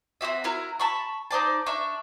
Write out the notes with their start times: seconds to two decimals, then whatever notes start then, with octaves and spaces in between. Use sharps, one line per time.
0.21 C4 D4 F#4 E5
0.44 E4 F#4 A#4 A#5
0.80 A5 B5 C#6
1.31 D#4 C5 D5 A5
1.66 D4 E5 C#6